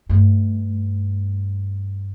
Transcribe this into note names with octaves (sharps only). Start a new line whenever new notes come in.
G2 A3